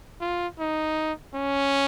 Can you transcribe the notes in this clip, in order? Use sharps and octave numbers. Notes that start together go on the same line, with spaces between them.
F4
D#4
C#4